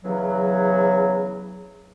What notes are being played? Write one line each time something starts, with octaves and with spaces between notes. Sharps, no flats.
E2 C#3 F#3